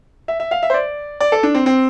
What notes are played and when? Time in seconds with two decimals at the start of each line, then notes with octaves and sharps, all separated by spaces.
0.28 E5
0.40 E5
0.51 F5
0.63 E5
0.70 C5
0.74 D5
1.20 D5
1.32 A4
1.43 D4
1.55 C4
1.66 C4